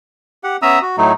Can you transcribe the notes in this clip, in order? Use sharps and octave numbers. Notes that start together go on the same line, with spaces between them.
G4 F#5
B3 C#4 E5 A#5 D#6 E6
F#4
A2 F#3 A3 D#4